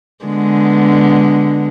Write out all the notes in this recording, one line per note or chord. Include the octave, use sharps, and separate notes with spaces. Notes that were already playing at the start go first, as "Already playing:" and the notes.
D3 G#3 B3